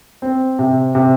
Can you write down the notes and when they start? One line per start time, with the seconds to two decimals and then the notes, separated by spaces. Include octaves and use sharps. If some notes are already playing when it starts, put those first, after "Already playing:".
0.22 C4
0.59 C3
0.95 C3